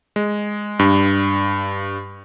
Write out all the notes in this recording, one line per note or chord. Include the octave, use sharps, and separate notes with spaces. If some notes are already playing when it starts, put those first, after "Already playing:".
G#3
G2